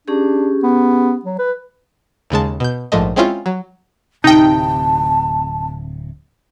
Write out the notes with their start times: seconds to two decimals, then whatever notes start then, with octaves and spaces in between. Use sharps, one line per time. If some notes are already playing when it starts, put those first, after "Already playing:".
0.08 C#4 D4 G4 G#4
0.63 B3
1.25 F#3
1.39 B4
2.30 D#2 C#3 G#3 A5
2.60 B2 G6
2.92 A#1 G#2 F3 A3 D#5
3.16 G#3 C4 C#4 E4 F4
3.46 F#3
4.24 D1 C3 D#4 G5 A5